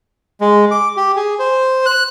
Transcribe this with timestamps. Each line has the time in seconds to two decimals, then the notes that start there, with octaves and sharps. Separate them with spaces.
0.41 G#3
0.71 D6
0.97 G4
1.16 G#4
1.39 C5
1.86 F#6